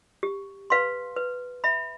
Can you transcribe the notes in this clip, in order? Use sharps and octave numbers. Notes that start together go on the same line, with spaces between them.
G4
B4 F5 C6
B4
E5 B5